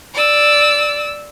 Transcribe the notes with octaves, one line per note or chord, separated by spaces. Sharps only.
D5 E6